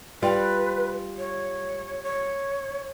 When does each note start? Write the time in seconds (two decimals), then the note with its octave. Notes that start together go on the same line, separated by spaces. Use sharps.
0.22 G3 F4 B4
1.18 C#5
2.03 C#5